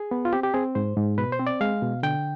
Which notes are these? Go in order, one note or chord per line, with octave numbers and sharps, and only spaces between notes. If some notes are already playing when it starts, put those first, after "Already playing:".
Already playing: G#4
B3
F4
C4 G4
G4
C4 G#4
G#2 C5
G#2
B2 B4
C5
C4
D5
G#3 F5
B2
D3 G5